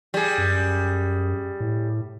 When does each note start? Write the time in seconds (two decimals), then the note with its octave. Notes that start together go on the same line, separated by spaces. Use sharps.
0.14 G3 G#4
0.38 F#2
1.60 A2